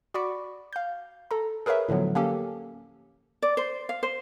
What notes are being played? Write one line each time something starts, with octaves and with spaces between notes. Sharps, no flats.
F#4 D5 B5 C#6 D6
F5 G6
A4 A#5
G#4 A#4 B4 C#5 E5
A2 D3 F3 F#3 B3
A#3 C#4 G4 A4
D5
C5
F5
C5